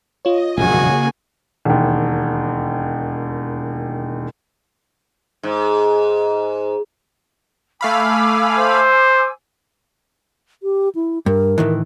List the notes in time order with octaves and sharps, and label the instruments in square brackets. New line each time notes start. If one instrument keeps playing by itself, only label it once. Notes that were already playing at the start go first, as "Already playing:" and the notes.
[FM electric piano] F4 C#5 [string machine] D#5
[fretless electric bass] E1 A#1 F#2 [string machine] C#3 A#3 G#4 [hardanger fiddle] F#4 G#5
[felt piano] E1 D#2
[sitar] G#2
[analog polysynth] A3 F5 B5 [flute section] G#5 D6 E6
[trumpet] C5
[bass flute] G4
E4
[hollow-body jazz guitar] G2 [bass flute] A#4
[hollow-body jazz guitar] A2 D#3 E3